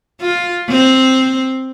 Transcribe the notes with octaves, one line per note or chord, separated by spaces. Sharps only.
F4
C4